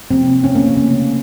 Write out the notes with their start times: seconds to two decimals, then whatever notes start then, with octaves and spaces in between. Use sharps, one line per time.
0.11 C3 F3 A#3 C4
0.44 C#4
0.55 A#3
0.66 C#4
0.77 C#3 A3 A#3